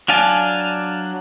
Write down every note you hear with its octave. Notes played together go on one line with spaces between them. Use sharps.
F#3 D4 F5 G#5 A5